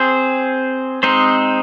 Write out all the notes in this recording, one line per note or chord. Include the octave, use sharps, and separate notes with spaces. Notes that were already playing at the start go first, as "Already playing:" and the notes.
Already playing: C4 G#4 C5
G#3 C4 D#4 C5